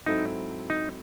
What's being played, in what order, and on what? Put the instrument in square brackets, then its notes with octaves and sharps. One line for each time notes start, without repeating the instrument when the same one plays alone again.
[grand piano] G#2 F#3 C4 E4 A4 [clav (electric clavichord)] D#4
[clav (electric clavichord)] D#4